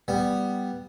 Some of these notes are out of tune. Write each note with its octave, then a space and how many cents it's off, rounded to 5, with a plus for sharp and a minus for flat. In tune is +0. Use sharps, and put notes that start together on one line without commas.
G3 +0 B3 +0